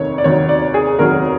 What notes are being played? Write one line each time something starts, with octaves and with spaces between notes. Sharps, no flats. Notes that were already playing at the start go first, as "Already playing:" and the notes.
Already playing: F1 D#2 D#3 C#5
D5
F1 D#2 D#3 F#3 C#5
D5
G#4
F1 D#2 D#3 F#3 A#4